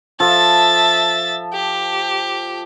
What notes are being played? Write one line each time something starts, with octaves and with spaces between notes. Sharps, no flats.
F3 A4 E5 A6
G4